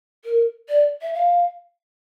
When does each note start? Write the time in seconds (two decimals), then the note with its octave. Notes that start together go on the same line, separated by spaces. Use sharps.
0.25 A#4
0.69 D5
1.02 E5
1.14 F5